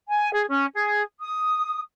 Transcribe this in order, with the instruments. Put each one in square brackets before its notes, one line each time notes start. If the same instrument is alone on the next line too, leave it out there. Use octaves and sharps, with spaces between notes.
[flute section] G#5
G#4
C#4
G#4
D#6